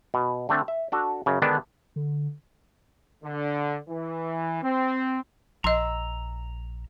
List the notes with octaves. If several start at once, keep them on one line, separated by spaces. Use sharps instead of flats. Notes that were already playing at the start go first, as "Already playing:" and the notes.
B2
D3 A3 C4 D4
E5
D4 F#4 A4
F#2 C#3
D3 D#3 G#3 B3 D4
D3
D3
E3
C4
A#1 D#5 A#5 C6 E6